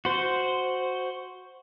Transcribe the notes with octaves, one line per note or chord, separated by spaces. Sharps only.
F#4 C5